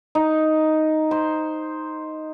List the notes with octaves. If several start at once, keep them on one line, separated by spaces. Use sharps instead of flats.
D#4
C5